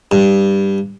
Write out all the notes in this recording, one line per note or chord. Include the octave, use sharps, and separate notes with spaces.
G2